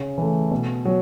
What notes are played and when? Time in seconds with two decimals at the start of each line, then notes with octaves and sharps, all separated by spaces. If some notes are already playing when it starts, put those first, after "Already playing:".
Already playing: C#3
0.18 E3 A3
0.51 B2
0.85 F#3